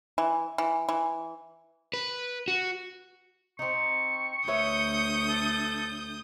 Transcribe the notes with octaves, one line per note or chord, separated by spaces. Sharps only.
E3
E3
E3
B4
F#4
C4 D#4 C#6
D2 B4 C#5 E5 D#6 G6
A4